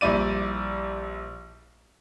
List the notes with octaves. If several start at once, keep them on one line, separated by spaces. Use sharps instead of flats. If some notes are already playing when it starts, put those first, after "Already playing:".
A#1 G3 E4 D5 D#7